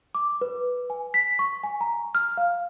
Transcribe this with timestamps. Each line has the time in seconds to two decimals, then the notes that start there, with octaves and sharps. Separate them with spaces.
0.15 D6
0.41 B4
0.90 G#5
1.14 B6
1.39 C#6
1.64 G#5
1.81 A#5
2.15 F6
2.37 F5